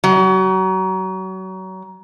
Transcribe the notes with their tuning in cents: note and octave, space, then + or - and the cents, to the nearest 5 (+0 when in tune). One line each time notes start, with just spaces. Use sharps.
F#3 +30